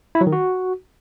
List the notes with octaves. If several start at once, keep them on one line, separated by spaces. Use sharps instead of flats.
E4
F#3
D#3
F#4